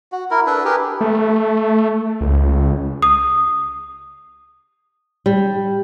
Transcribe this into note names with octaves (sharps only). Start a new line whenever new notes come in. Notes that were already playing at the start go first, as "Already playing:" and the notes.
F#4
E4 A#4
D4 A4 B4
G4 G#4 A#4 B4
A3
C#2
D#6
G3